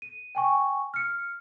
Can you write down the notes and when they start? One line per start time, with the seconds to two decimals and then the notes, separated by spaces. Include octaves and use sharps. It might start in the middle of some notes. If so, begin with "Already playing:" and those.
0.02 D#7
0.35 G5 G#5 C#6
0.94 F6 C#7